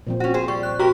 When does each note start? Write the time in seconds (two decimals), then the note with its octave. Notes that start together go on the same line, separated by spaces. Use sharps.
0.07 A#2 F3 C4
0.20 C#4 F#4
0.34 G#4 C5
0.48 G3 C#6
0.63 F#6
0.79 F#4 G4 A#4 A#5 C#6